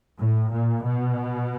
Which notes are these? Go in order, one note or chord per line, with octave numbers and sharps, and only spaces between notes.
A2
A#2
B2